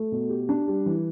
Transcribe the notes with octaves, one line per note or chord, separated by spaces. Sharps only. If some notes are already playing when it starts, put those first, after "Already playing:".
Already playing: A3
B2
G4
D4
G3
E3